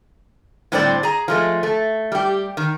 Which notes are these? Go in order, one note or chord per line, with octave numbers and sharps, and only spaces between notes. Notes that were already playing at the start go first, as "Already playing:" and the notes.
A2 D3 G3 C4 C5 D5
G#4 A#5
F3 G#3 A3
A3
G3 G4
D#3